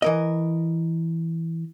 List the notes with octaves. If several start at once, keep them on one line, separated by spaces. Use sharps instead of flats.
E3 A#4 D#5